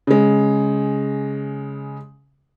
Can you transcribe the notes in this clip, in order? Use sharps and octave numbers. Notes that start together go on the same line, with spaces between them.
C#3 G#3